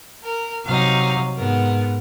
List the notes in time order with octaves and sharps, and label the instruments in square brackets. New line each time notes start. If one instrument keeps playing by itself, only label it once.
[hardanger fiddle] A#4
[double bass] C3 F#3 [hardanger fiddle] D#4 F5
[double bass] G#2 [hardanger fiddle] B3 A#4